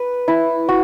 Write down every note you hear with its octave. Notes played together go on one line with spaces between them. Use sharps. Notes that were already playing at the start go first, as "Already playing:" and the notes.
Already playing: B4
E4
F#4